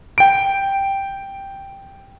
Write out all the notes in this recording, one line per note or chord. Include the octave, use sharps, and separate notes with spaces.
G5 D7